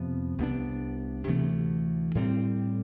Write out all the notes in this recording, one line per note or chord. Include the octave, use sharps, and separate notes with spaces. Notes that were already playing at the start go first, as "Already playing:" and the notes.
Already playing: F2 C3 F3 B3
C2 B2 B3 D4
D2 C3 E3 A3
A2 G3 C4